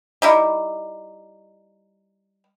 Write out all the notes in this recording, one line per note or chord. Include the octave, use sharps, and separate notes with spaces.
G3 D#4 E4